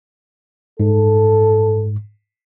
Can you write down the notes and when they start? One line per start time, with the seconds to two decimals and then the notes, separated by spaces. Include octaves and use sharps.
0.80 G#2 A4